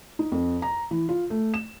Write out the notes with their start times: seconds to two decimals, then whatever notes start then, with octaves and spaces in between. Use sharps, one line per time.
0.19 D#4
0.32 F2
0.62 A#5
0.91 E3
1.09 F4
1.30 A3
1.54 E7